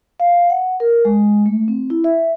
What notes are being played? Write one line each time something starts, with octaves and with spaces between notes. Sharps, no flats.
F5
F#5
A#4
G#3
A3
C4
E4
E5